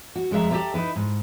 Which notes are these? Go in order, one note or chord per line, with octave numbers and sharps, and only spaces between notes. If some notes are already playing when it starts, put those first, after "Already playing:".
F#4
F2 G#3 D#4 E5 A#5
G4 A4 C#5 D5 E5 A#5
D#4 E4 B4
G#2